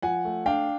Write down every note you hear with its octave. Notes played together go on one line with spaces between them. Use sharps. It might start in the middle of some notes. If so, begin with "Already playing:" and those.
F3 F#5 G#5
A3
D4 F5 G5